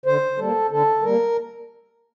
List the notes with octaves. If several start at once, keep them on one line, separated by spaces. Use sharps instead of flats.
D3 C5
G3 A#3 A4
D3 A4
G3 A#3 A#4